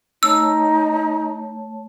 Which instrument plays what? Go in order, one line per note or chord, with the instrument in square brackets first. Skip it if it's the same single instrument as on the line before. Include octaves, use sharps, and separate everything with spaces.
[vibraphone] A3 C#5 A5 [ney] D#4 [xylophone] E6